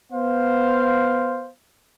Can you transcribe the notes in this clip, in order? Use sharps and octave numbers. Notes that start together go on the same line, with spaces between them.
B3 C5 F5